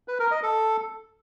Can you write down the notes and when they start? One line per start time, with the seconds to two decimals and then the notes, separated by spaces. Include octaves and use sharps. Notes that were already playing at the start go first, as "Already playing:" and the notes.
0.08 B4
0.20 A#4
0.31 D#5
0.43 A4